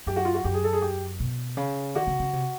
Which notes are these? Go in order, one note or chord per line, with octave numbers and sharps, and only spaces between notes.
F#2 G4
F#4
F4
F#4
F#2 G4
G#4
A4
G#4
G4
B2
C#3
D3 F#4
C#3
C#3
C3